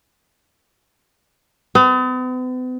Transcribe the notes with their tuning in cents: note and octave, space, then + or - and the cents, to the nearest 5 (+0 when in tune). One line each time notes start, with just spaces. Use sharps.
B3 +45